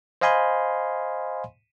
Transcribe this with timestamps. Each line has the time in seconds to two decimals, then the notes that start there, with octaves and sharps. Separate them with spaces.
0.21 C5 D#5 F5 G#5 B5 C6